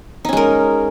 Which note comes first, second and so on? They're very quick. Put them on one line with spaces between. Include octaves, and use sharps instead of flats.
D#4 C#4 G#3 A#4